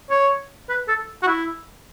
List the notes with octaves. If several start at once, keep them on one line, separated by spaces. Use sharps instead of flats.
C#5
B4
A4
F#4
E4